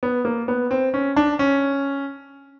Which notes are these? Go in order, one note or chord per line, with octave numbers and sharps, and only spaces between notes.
B3
A#3
B3
C4
C#4
D4
C#4